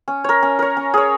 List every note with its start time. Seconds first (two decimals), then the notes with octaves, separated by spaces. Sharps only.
0.08 C#4
0.24 A#4 C#5
0.43 C#4
0.59 A#4 C#5
0.77 C#4
0.94 G#4 C#5